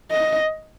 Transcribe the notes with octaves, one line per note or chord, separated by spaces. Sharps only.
D#5